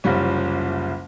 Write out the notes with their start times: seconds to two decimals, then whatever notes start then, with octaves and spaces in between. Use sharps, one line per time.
0.04 F#1 C2 F3 G3 C#4